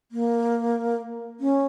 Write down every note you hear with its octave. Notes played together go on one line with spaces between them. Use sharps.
A#3
C#4